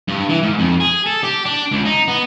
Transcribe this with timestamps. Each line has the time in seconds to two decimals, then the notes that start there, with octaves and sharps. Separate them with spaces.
0.08 G2
0.29 E3
0.43 G#2
0.59 F2
0.80 G#4
1.06 A4
1.23 G4
1.45 D4
1.72 C#2
1.85 D#4
2.08 B3